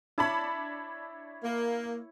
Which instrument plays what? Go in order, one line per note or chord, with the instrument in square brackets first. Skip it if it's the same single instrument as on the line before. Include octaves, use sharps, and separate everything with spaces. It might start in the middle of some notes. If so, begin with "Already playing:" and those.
[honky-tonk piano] D4 A5 B5 [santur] E4 C#5
[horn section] A#3